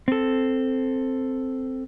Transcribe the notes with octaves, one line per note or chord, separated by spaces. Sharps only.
C4 A4